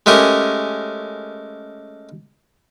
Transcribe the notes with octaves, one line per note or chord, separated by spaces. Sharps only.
G#3 A3 C#4 G4 A#4